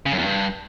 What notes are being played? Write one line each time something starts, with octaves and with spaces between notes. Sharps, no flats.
C#3
F#2
E2
G2